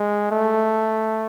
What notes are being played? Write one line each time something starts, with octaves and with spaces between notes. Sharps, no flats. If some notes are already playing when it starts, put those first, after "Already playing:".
Already playing: G#3
A3